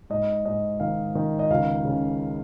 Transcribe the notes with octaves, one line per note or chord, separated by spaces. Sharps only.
G#2 D#5
G#2 D#5
D#3 F5
D#3 D#5
D#5
C#2 F5
C#3